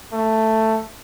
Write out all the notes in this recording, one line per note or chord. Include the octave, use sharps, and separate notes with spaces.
A3